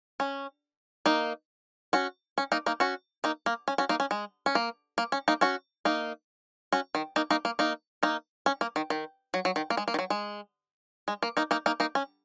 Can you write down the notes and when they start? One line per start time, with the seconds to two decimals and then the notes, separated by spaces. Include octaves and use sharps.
0.20 C#4
1.06 A#3 D#4
1.93 C#4 F#4
2.38 C#4
2.52 A#3 D#4
2.66 A#3 D#4
2.80 C#4 F#4
3.24 A#3 D#4
3.46 A#3
3.68 C#4
3.78 C#4 F#4
3.89 A#3 D#4
4.00 C#4
4.11 G#3
4.46 C#4
4.55 A#3
4.98 A#3
5.12 C#4
5.28 A#3 D#4
5.41 C#4 F#4
5.85 A#3 D#4
6.72 C#4 F#4
6.95 D#3
7.16 A#3 D#4
7.30 A#3 D#4
7.45 A#3
7.59 A#3 D#4
8.03 A#3 D#4
8.46 C#4
8.61 A#3
8.76 D#3
8.90 D#3
9.34 F#3
9.45 F#3
9.56 D#3
9.70 A#3
9.77 G#3
9.88 A#3
9.94 D#3
9.99 F#3
10.10 G#3
11.08 G#3
11.23 A#3
11.37 A#3 D#4
11.51 A#3 D#4
11.66 A#3 D#4
11.80 A#3 D#4
11.95 C#4